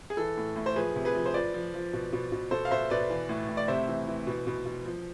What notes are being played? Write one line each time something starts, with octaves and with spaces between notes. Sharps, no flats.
G#4
E3 A4
A2
A2
C5
F3 G#4 B4
C3
G#4 B4
F3
C5
F3 B4 D5
F3
F3
B2
B2
B2
B2 A4 C5
F5
B2 C5 E5
B2 B4 D5
E3
A2
A2
D5
C3 C5 E5
E3
E3
B2
B2
B2
F3